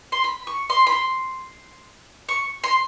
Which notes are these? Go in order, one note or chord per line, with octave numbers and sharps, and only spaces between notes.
C6
B5
C#6
C6
B5
C6
C#6
C6